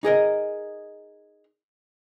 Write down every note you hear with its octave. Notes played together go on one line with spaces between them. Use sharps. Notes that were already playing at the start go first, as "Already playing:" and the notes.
D#4 G#4 A#4 D#5